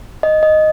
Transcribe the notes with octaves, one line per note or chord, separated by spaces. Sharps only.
D#5
D#5